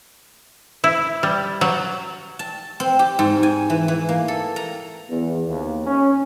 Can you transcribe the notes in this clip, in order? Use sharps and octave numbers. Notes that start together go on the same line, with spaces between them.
E4
G3
F#3
A5
C4
G4
G#2
G#5
E3
E3
A#3
A4
A#5
E2
D#2
C#4